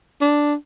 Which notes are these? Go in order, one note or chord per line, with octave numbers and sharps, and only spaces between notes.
D4